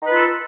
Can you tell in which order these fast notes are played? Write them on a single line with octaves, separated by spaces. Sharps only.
D#4 B4 F4 A4